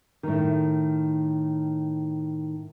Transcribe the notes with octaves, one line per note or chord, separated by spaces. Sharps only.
A2 D#3